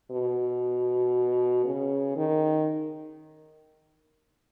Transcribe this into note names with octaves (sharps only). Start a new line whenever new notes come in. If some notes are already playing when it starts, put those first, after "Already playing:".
B2
C#3
D#3